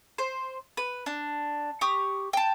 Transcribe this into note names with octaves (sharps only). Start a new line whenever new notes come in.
C5
B4
D4
G4 C#6 D#6
G5 A5